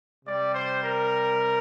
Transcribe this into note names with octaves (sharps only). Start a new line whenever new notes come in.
C3 G3 D5
C5
A#4